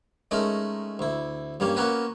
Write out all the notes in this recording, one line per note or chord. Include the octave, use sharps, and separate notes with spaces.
G#3 A3 C#4 D#4 A#4
D2 E4
G2 G3 A#3 C#4
A#3 B3 C#4 F#4 A#4 B4